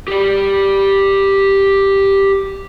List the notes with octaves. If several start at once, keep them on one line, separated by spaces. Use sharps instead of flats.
G4 D5